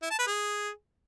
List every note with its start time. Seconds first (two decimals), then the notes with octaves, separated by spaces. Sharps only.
0.02 E4
0.11 A5
0.19 B4
0.27 G#4